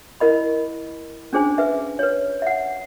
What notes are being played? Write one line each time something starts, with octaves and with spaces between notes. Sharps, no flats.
E4 A#4 D#5 B5
C#4 D4 G#4 C5 G#5
B4 E5
B4 C#5
E5 F#5